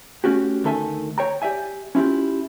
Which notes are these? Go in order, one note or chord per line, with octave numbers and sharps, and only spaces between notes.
A3 C#4 F#4 G4
D2 D#3 A4 E5 G#5
C#5 G5 A#5
G4 D5 E5 G#5
C#4 E4 F4 G4